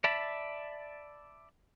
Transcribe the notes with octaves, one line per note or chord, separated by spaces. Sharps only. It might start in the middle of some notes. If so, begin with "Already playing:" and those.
D5 E5 A5 B5